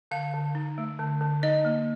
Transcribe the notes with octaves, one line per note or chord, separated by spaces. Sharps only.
D3 F5
D3
D#4
A3
D3
D3
D#4 D#5
A#3